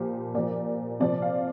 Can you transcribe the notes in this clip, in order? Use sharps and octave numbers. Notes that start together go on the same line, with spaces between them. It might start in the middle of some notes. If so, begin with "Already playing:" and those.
Already playing: A#2 F3 G4
A#2 F3 D5
C3 F3 D5
F5